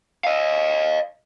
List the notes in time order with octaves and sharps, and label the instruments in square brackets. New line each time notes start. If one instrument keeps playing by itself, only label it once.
[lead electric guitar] D#5 F5